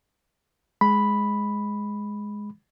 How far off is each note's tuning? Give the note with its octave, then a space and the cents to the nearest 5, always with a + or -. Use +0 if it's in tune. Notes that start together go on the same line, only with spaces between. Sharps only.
G#3 +0 B5 +0